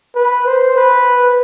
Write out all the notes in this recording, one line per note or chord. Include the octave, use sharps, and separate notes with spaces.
B4
C5
B4